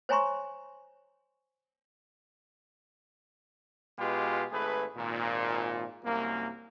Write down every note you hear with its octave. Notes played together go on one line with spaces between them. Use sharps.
C5 C#5 G#5 A#5 C6 C#6
B2 G#3 F4 G4 B4
G#1 A3 G#4 B4
G#1 A#2
C2 F#2 A#3